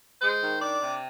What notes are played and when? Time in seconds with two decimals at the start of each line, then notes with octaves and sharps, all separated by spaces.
0.22 G#3 C5
0.42 D#3
0.61 D4 D5
0.80 C3